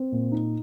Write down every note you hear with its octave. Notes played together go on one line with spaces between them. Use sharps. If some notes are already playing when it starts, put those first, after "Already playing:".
Already playing: C4
A#2
D#4